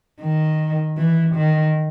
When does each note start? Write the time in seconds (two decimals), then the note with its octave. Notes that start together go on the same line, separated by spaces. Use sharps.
0.21 D#3
0.97 E3
1.35 D#3